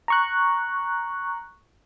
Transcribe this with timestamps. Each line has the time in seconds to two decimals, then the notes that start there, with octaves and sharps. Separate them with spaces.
0.08 A#5 C#6 F#6